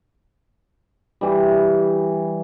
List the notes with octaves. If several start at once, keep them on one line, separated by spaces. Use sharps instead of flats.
E3 G3